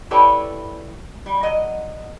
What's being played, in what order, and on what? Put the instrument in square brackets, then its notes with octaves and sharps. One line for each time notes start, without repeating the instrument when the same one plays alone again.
[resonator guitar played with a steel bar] E4 G4 A4 B4 C#5 D5
G3
F#3 D#5